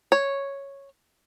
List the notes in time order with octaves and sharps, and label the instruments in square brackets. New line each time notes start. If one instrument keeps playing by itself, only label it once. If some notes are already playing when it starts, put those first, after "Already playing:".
[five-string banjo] C#5